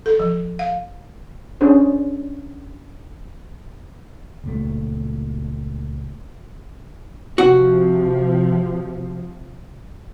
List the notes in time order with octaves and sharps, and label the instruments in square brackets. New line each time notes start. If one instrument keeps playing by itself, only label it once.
[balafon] A4
F3
F5
[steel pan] C#4 D4 G#4 C5
[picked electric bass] C#2 A#2 A3
[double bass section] C3 F3 [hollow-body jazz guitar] F#4